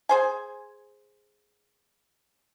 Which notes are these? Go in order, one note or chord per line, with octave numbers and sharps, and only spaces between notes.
G#4 C5 G#5